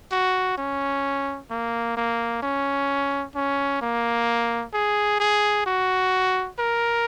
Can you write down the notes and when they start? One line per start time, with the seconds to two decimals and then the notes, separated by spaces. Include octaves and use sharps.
0.11 F#4
0.58 C#4
1.50 A#3
1.96 A#3
2.43 C#4
3.35 C#4
3.81 A#3
4.73 G#4
5.20 G#4
5.66 F#4
6.59 A#4